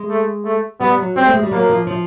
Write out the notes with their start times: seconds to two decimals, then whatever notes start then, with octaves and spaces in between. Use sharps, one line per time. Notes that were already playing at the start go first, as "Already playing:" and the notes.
Already playing: G#3
0.10 A3
0.45 A3
0.80 G3 B3
0.98 F#3
1.16 G3 C4
1.25 A3
1.34 G#3
1.43 G3
1.51 F#3 A#3
1.69 F3
1.87 F3